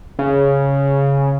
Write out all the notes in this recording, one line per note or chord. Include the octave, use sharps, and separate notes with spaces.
C#3